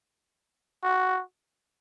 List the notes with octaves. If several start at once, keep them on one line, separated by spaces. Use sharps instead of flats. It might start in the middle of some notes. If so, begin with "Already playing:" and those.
F#4